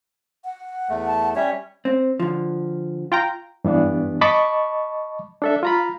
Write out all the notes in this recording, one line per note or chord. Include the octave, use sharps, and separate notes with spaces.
F#5
E2 A3
A5
G3 C#4 C#5 E5
C4
D3 F3
F4 G5 A#5
G2 E3 B3 D4
D#5 A5 B5 C#6 D6
D4 A4 E5
F4 A#5 B5